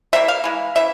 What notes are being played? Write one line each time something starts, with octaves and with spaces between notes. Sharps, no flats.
E3 G3 A#3 E5
F5
E3 G#3
C#3 E3 E5